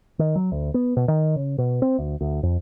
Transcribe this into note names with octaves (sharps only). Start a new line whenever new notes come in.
D#3
F#3
D2
B3
B2
D#3
C#3
B2
C4
D2
D2
F2